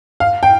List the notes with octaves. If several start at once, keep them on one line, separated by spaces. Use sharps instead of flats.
F5
G5